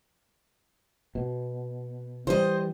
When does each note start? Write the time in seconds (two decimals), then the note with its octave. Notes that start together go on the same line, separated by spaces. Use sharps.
1.15 B2
2.27 E3 F#3 G3 C5 D#5